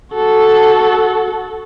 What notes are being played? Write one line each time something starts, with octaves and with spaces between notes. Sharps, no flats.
F#4 A4